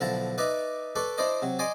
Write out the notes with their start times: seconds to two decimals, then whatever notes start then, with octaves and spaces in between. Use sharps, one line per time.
0.01 B1 D3 F3 E4 A5 A#5
0.38 D#4 B4 D5 E5 A#5
0.96 A4 B4 D5 C#6
1.18 D4 E4 C5 D5 D#5
1.42 C3 F#3
1.59 D5 D#5 G#5 C6 D6